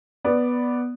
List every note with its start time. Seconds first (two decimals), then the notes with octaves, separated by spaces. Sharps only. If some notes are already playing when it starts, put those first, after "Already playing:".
0.24 B3 D5